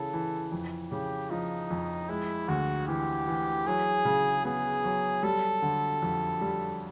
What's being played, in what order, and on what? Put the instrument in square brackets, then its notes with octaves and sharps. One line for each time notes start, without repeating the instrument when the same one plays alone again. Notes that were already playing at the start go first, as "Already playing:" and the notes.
Already playing: [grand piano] C#3 E3 [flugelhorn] A4
[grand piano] E3
F2
[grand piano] C#3 [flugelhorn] G4
[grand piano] F3 [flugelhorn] D#4
[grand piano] F2
[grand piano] G#3 [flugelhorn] E4
[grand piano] D2 [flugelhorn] F#4
[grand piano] E3 [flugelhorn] G4
[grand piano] E3
[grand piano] F#3 [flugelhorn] G#4
[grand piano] C#3
[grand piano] B3 [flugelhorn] G#4
[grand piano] F#3
[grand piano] G3 [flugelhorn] A4
[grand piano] D3
F2
G3